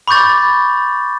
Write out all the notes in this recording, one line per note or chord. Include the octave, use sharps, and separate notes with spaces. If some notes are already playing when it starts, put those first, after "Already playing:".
B5 C#6 D6 G6 A6